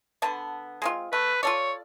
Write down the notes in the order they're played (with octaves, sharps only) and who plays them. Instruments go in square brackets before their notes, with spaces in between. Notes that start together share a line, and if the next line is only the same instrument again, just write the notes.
[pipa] D3 B3 A5
G#3 C4 F4
[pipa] A3 [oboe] B4
[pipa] F4 A4 D5 [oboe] C#5